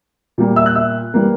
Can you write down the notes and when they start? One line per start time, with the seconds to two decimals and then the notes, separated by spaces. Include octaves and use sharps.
0.38 A#2 G3 A#3
0.56 E5 E6
0.66 F#6
0.75 E5 E6
1.14 E3 G3 A#3